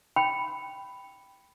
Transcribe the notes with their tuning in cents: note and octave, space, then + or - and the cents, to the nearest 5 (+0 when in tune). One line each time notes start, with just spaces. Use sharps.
G5 +0 B5 +5